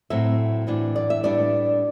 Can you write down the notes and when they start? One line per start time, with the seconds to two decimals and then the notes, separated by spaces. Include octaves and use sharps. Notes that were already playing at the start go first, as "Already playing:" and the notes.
0.10 A2 F#3 C4 E5
0.67 A2 E3 B3 D4
0.96 D5
1.10 E5
1.23 A2 G3 B3 D4 D5